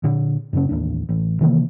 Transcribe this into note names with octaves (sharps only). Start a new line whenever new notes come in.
A#2 D3
F#2 C#3 C#4
A1 D#2 D4
A1
C3 D#3 E3 A#3